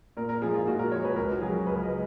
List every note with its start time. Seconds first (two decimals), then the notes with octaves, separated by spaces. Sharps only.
0.17 A#2 A#4
0.29 A#4
0.42 F3 G#3 G#4
0.54 F4
0.67 A#2 F#4
0.79 A#4
0.92 F3 G#3 C#5
1.05 B4
1.16 C#2 A#4
1.32 F#4
1.41 C#3 F#3 G#4
1.66 C#2 B4
1.83 D#5